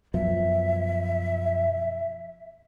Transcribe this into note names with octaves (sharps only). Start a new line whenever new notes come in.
F#2 B2 F3 E5